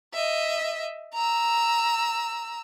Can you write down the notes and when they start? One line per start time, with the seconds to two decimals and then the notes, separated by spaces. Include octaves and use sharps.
0.14 D#5 E5
1.14 A#5 E6